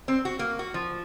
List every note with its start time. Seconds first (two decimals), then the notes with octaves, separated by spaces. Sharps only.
0.08 C4
0.25 F#4
0.39 A#3
0.59 F#4
0.74 F3